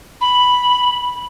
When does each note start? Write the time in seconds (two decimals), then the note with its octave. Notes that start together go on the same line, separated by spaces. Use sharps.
0.21 B5